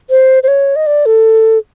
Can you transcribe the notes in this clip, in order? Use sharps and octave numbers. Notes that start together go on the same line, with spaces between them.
C5
C5
C#5
D#5
D5
A4